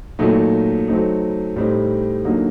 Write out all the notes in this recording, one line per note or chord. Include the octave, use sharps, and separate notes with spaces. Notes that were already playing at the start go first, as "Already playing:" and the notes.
A#2 F#3 A3 D#4
F#3 A3 C4 D#4
A2 G3 C4 D#4
D3 F#3 A#3 D#4